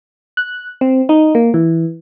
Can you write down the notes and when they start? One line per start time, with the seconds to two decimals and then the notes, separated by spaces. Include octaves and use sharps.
0.37 F#6
0.81 C4
1.09 D#4
1.35 A#3
1.54 E3